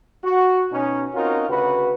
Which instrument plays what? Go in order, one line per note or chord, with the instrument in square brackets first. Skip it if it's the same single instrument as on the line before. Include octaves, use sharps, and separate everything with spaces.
[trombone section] F#4
B2 C#4 D#4
C4 C#4 D#4 F4 F#4 A#4
D2 C#3 F#4 B4